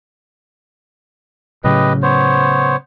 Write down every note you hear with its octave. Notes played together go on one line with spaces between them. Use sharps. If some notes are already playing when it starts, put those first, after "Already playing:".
A2 C#3 F#3 G4 B4 D#5
B3 C5 C#5